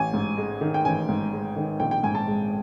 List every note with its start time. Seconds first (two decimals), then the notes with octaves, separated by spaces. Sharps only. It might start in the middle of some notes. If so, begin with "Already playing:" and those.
Already playing: A1 G#5
0.13 G#2
0.37 G#3
0.61 D#3
0.74 G5
0.85 A1 G#5
1.09 G#2
1.32 G#3
1.56 D#3
1.80 A#1 G5
1.91 G5
2.03 G#2 G#5
2.15 A5
2.27 G#3